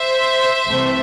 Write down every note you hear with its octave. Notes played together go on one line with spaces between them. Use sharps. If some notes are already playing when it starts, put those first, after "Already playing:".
Already playing: C5 E5
C2 C3 E3 A3